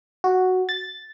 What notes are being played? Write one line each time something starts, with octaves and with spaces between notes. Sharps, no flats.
F#4
A6